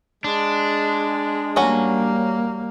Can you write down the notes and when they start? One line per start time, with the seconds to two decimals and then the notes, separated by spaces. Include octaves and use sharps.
0.24 G#3 D4
1.56 F#3 G3 A#3 C#4 F#4